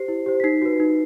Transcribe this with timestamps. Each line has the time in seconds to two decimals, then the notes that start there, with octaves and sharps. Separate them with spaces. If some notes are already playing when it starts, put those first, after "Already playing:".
Already playing: G4 C5 C7
0.08 E4
0.26 G4 C5
0.40 B6
0.44 D#4 C7
0.62 F#4 B4
0.80 D#4